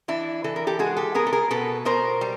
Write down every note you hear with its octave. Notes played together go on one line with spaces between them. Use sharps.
E3 D4 E4
E3 A4
A#4
G4 A4
G#3 F#4 G#4
G4 A4
B3 G#4 A#4
A4
G#4 A#4
B2 A4 B4
B2 A#4 C5
G3